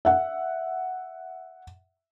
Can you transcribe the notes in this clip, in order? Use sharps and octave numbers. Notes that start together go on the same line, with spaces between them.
E5 F#5